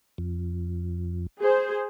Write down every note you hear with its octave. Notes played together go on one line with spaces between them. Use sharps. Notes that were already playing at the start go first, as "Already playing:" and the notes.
F2
G#4 C5